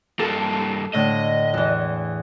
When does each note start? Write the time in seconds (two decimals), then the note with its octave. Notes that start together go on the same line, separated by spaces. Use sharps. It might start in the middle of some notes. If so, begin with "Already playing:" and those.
0.19 G2 A#3 A4
0.94 A2 D3 D#5
1.54 E2 E3